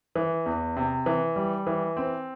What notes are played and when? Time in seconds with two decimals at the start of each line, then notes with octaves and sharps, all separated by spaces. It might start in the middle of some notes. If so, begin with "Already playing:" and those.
0.16 E3
0.46 E2
0.76 C3
1.06 E3
1.36 G3
1.67 E3
1.97 C4